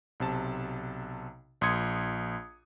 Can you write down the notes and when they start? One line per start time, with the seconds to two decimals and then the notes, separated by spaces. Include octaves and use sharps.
0.20 B1 C3 A5
1.61 A#1 C6 D#6 G#6 C#7